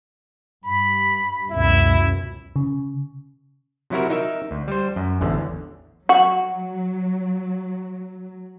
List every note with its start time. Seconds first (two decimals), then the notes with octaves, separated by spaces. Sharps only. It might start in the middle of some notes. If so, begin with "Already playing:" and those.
0.64 G2 B5
1.50 C#2 F#2 B2 E4
2.56 C#3
3.90 C3 F#3 E4 F#4 A#4
4.10 D#4 A#4 E5
4.51 D2
4.68 G3 C5
4.96 F#2
5.21 A1 E2 D3
6.09 F#3 F#4